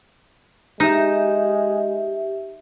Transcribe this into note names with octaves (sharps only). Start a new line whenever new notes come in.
G#3 D#4 G4 E5